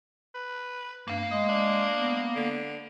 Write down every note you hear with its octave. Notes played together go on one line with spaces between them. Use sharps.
B4
G2 A#3 F5
G#3 D#5
D4
B3
D3